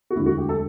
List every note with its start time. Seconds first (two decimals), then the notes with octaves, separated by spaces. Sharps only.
0.11 F#4
0.16 E1 D2 D3 F#3 E4
0.26 F#4
0.38 G4
0.49 A4